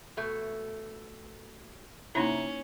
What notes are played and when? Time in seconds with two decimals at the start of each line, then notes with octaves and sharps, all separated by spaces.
0.17 B2 A3
2.15 C3 A#3 C#4 D#4 E4 A#5